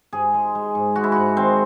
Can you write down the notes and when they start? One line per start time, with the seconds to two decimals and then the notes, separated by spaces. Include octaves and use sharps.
0.13 G#2 G#4
0.34 G#3
0.55 G#3
0.75 G#2
0.96 G#3 F#4
1.04 E4
1.12 G#2 F#4
1.37 D#3 C4